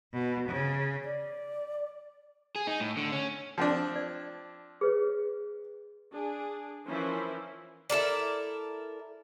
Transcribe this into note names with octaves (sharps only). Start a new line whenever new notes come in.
B2
C#3
D5
G#4
D#4
A2
D3
C#4
F3 C4 D4
D5
G#4 B4 C#5
D4 G#4
E3 F3 C#4 E4 A#4 C5
E4 A4 A#4 D5